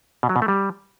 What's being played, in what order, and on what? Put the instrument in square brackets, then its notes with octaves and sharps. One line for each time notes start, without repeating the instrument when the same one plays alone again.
[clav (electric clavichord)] B2
F#3
B2
A3
G3